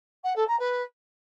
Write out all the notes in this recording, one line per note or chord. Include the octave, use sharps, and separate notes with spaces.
F#5
A4
A#5
B4